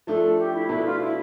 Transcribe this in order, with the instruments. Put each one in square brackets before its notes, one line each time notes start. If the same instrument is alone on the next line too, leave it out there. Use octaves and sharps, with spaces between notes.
[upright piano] F3 A3 D4 [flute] A4
[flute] A4
G4
E4
[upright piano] B2 A3 D4 [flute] E4
[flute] F4
E4